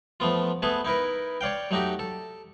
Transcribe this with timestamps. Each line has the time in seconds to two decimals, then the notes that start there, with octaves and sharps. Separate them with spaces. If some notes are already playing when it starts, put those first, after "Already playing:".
0.20 F3 A3 B3 F4
0.62 A3 B3 G#4 A4 B4
0.85 D#4 E4 A#4 B4
1.41 C#5 D5 F5 G5
1.71 F#3 A3 D#4 F#4 G4
1.99 A4